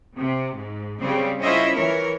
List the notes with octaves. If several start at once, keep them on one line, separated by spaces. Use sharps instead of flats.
C3
G#2
C#3 G3 C4
C#4 E4 F4 C5 D#5 E5
E3 A#4 C#5